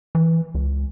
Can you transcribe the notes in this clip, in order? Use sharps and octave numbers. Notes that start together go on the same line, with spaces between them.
E3
C#2